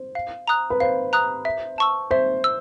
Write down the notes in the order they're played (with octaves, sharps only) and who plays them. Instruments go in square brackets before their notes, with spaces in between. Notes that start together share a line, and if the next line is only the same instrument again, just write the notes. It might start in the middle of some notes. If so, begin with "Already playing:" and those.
Already playing: [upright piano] C5
[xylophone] F5
A#5 D#6 F#6
[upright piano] B4
[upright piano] C5 [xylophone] F5
[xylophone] A#5 D#6 F#6
E5
A5 C#6 E6
[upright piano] C5 [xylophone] E5
[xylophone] E6